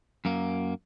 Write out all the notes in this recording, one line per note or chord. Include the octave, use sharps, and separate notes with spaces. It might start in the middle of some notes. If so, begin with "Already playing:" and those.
F#2 A#3